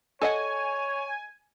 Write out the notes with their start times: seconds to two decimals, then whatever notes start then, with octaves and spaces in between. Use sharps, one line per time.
0.22 A4 C#5 D#5 F#5 G#5